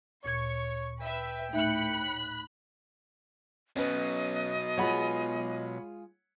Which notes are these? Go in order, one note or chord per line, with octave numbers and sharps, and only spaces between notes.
D2 A#2 C#5 C#6 G#6
B4 E5 G5
A2 D#4 E5 B5 F#6 C#7
B2 F#3 C#4 B4 D#5
G#3 F4 G#4 C#5 F#5 B5